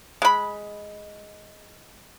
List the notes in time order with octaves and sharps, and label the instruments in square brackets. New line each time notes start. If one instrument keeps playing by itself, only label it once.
[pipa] G#3 B5